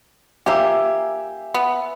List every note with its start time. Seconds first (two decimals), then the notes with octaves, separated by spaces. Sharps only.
0.46 A#3 G4 E5 G#5
1.54 B3